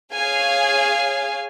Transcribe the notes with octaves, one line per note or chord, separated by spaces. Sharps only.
G#4 C#5 F5 G#5